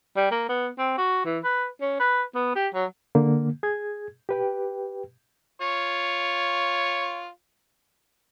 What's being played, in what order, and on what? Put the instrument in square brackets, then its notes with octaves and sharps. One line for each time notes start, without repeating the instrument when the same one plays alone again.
[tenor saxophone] G3
A#3
B3
C4
F#4
E3
B4
C#4
B4
B3
G4
F#3
[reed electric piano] D3 A#3
G#4 G#6
G4 B4 G5
[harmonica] F4 C#5